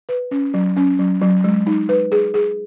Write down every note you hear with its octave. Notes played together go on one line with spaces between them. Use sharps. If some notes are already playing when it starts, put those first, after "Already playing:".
B4
C#4
F#3
C#4
F#3
F#3
G#3
D#4
B4
G#4
G#4